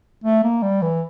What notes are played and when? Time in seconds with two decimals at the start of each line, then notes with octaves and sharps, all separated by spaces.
0.24 A3
0.43 A#3
0.62 G3
0.82 E3